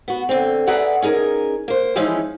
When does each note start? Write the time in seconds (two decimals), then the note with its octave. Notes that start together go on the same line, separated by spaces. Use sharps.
0.08 B3 F#4
0.29 D3 C4
0.67 G#4 B4 D5 E5 F#5 A#5
1.02 C#4 D#4 G#4 A#4
1.68 A#3 C5
1.96 E3 F3 G#3 C#4 D#4 E4